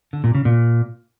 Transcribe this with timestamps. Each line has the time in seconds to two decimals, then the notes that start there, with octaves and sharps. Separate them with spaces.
0.13 D3
0.24 A#2
0.35 C#3
0.45 A#2